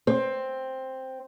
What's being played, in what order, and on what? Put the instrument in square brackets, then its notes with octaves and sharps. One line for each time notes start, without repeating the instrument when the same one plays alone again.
[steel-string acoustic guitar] C4